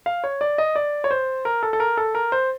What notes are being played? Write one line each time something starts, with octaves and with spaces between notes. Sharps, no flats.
F5
C#5
D5
D#5
D5
C#5
C5
A#4
A4
A4
A#4
A4
A#4
C5